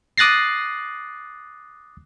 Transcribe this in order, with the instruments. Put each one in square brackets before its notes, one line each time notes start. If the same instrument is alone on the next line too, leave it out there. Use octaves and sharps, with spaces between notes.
[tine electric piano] D6 D#6 F#6 A6 A#6 C7